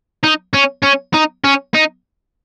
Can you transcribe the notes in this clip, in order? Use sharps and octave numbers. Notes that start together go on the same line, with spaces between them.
D#4
C#4
C#4
D#4
C#4
D#4